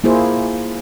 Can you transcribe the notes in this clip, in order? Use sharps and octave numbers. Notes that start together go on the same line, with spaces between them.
A#3 E4 F4 G#4 C5